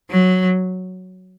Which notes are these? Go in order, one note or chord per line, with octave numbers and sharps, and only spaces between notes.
F#3